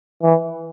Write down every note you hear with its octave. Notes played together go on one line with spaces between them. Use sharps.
E3